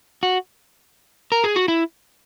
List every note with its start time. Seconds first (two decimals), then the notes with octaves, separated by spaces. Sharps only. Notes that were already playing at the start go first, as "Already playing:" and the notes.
0.23 F#4
1.32 A#4
1.44 G#4
1.56 F#4
1.68 E4